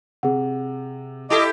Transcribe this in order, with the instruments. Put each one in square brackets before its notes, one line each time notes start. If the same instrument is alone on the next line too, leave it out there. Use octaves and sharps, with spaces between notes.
[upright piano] C3 [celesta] G#4 F#5
[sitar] E4 G4 A4 [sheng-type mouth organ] D#5 D6